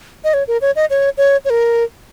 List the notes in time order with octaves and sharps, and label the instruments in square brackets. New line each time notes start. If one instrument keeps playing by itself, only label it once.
[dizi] D#5
C#5
A#4
C#5
D#5
C#5
C#5
C#5
A#4